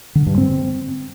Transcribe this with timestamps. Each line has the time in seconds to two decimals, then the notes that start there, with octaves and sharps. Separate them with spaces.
0.15 D3
0.26 G2
0.38 C4